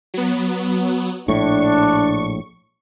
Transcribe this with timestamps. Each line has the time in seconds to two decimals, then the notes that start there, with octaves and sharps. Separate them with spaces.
0.14 F#3 B3
1.28 A#1 A2 D4 C#6